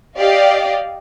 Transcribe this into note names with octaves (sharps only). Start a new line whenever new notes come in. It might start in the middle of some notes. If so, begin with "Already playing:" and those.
G4 D5 D#5 F5